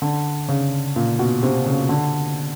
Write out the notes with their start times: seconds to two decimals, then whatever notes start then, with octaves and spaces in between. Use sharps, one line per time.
0.02 D3
0.48 C#3
0.96 A#2
1.19 B2
1.43 C3
1.66 C#3
1.89 D3